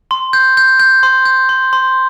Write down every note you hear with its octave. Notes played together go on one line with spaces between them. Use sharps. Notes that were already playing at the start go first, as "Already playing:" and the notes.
C6
G6
G6
G6
C6
G6
C6
C6